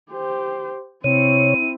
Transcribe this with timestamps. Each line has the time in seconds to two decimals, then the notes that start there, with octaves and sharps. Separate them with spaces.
0.11 G4 C5
1.04 C3 C4 E4 C#5 D#7